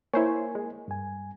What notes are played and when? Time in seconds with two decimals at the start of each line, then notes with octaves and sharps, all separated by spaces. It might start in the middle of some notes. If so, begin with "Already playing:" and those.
0.14 A#3 E4 A#4 C5 C#5 G#5
0.55 G#3
0.88 G2 G#5